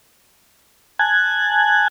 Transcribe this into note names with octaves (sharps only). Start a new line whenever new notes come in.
G#5 A5 F#6 G#6